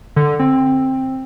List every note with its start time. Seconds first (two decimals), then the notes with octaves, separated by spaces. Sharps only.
0.16 D3
0.39 C4